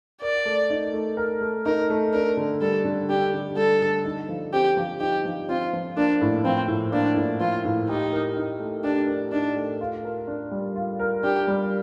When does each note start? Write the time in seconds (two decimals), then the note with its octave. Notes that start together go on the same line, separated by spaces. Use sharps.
0.22 A#4 D5
0.45 A3
0.70 D#4
0.93 A3
1.17 A#4
1.41 A3
1.66 D#4 A#4
1.90 A3
2.13 D4 A#4
2.37 D3
2.61 G3 A4
2.85 D3
3.09 D4 G4
3.34 D3
3.56 G3 A4
3.81 D3
4.05 D#4
4.28 F3
4.53 C4 G4
4.77 F3
5.00 D#4 G4
5.25 F3
5.49 C4 F4
5.73 F3
5.97 A#3 D4
6.21 A2
6.44 F3 C4
6.68 A2
6.92 A#3 D4
7.17 A2
7.40 F3 F4
7.65 A2
7.89 D#4 G4
8.12 A#4
8.37 D#4
8.60 A3
8.84 D4 G4
9.08 A#4
9.32 D4 D#4
9.56 A3
9.81 F4
10.04 A#4
10.27 D4
10.51 G3
10.76 F4
10.99 A#4
11.23 D4 G4
11.47 G3